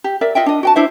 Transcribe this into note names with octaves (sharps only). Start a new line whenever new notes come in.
G4
A#4 D5 E5
F4 D#5 E5 G5
D4 D#5
F#4 G5 A5
D4 E4 C5 E5